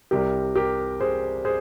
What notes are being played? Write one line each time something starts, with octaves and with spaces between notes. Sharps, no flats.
C2 C3 G3 G4 A#4
G4 A#4
G#4 C5
G#4 C5